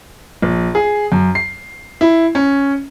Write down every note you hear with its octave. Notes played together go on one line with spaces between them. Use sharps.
A#1
G#4
F#2
C7
E4
C#4